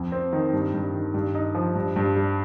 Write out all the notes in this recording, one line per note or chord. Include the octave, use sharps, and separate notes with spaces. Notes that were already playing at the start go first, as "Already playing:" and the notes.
Already playing: F2
C4
D#3
G2
G2
D#3
G2
D#4
F3
G2
G2
G3